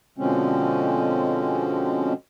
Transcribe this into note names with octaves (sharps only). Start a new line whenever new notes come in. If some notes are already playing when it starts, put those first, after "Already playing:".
B2 D3 F3 G#3 C4 C#4